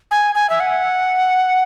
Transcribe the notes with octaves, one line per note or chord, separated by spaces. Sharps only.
G#5
G#5
E5
F#5